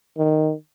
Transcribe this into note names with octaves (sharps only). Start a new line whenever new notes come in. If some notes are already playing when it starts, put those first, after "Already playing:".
D#3